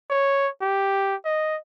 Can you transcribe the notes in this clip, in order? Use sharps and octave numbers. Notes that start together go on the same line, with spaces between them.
C#5
G4
D#5